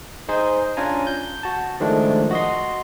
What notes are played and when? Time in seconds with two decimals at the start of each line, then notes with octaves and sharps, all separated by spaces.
0.29 D#4 G#4 C5
0.77 C#4 D4 F4 G#5 A#5
1.07 G6
1.43 F#4 A5
1.80 D#3 F3 G#3 A3 D4
2.31 F#4 D#5 C6